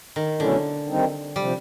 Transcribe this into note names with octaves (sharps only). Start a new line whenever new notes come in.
D#3
B2 D3 F#3 A3 C#4 E4
D#3 G3 C4 D#4
C3 F3 G3